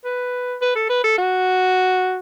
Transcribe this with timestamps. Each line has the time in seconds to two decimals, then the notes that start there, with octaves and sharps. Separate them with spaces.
0.05 B4
0.62 B4
0.76 A4
0.90 B4
1.04 A4
1.18 F#4